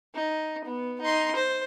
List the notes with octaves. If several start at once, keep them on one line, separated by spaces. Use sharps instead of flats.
D#4
B3
D#4 C6
C5